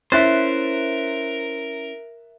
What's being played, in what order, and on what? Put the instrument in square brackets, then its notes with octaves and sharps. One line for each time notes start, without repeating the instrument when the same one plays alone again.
[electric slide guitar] C#4 E4 [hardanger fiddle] A#4 [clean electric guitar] C5 [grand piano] E5 F#6 A6